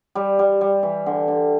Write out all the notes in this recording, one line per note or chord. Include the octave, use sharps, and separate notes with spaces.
G3
G3
G3
E3
D3
D3